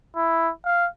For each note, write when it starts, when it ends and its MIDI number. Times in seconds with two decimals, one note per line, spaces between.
0.17 0.51 64
0.65 0.88 77